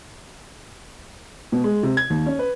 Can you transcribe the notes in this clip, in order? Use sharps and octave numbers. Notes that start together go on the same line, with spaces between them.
B2
G#3
C3
G#6
D#2
C#4
B4